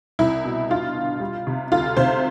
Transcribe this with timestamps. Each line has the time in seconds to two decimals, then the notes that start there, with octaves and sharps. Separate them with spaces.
0.19 C2 E4
0.45 B2
0.71 G2 F4
0.95 D3
1.20 G3
1.47 C3
1.72 D2 F4
1.97 C3 C5